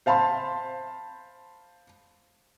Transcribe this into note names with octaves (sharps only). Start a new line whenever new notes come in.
C5 F5 A5 B5 C6